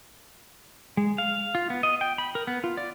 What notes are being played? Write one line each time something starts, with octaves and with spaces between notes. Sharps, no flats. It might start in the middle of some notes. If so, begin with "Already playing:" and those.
G#3
F5
F4
B3
D#5
G5
B5
A#4
B3
F4
D5